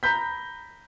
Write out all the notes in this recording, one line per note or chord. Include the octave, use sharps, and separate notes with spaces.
A#5 B5 G6 B6